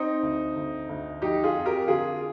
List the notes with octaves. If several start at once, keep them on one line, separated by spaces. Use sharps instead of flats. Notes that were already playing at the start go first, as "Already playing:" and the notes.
Already playing: C4 D#4
D2
D2
D2
F3 D#4 G4
F4 G#4
F2
G4 A#4
D3 F4 G#4